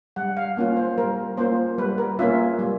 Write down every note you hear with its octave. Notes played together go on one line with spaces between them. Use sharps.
G3 F#5
F5
A#3 C#4 F4
C5
G3 A#4
A#3 C#4 F4 C5
G3 B4
A#4
A#3 C#4 F4 E5
G3